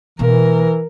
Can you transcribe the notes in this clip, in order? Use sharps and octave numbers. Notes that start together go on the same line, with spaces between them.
B2 E3 A#3 A#4